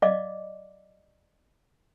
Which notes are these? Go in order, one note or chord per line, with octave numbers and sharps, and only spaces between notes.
D5 D#5 F5 D6